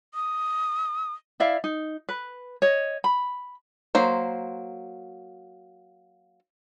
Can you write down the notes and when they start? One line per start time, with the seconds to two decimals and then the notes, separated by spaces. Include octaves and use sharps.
0.14 D#6
1.40 E4 D5 E5 F5
1.64 D#4
2.09 B4
2.62 C#5 D#5
3.04 B5
3.95 F#3 A#3 C5